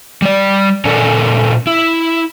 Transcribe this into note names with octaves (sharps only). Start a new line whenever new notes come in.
G3 D5
A#2 C#4 A4 A#4 D5
E4